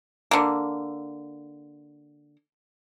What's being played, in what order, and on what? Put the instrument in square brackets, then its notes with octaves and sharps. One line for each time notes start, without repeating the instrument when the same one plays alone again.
[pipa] D3 A#3